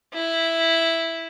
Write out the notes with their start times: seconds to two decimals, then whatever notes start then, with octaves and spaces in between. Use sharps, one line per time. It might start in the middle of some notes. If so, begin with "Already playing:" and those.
0.14 E4